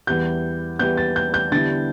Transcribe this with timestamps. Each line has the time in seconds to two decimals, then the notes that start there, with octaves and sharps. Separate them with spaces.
0.07 E2 E3 G3 G6
0.79 E2 E3 G3 G6
0.97 A6
1.16 G6
1.34 G6
1.52 D3 G3 B3 E4 A6